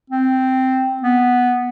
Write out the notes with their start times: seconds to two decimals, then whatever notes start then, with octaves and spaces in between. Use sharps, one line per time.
0.10 C4
1.03 B3